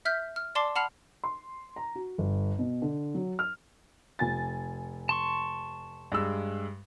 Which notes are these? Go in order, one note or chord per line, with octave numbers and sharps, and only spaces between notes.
E5 F6 G6 B6
F6
D5 A5 C6 D6 C7
F#5 A5 B5 F6 C7 F7
C6
A#5
F#4
G1
B2
D3
F#3
F6
F1 G#5 A6
A5 C6 C#6
G2 G#3 E6